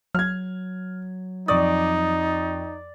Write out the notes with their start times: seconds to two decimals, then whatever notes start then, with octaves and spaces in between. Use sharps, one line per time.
0.15 F#3 F6 G#6
1.48 F2 D#4 D5 C#6 D#6